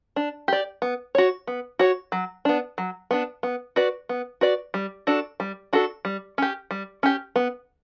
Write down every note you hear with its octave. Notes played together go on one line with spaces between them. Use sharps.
D4
G4 D5
B3
F#4 C#5
B3
F#4 C#5
F#3
B3 D4
F#3
B3 D4
B3
F#4 B4 D5
B3
F#4 B4 D5
G3
D4 F#4 A4
G3
D4 F#4 A4
G3
C#4 G4
G3
C#4 G4
B3